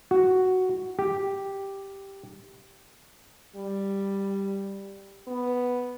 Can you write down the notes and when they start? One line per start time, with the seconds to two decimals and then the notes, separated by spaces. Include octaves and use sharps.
0.11 F#4
0.99 G4
3.56 G3
5.27 B3